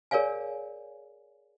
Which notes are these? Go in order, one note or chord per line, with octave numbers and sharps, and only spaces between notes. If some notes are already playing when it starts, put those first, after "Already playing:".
G#4 A#4 C#5 D5 F5 G#5